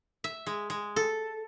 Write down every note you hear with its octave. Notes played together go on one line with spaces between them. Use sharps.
E5
G#3
G#3
A4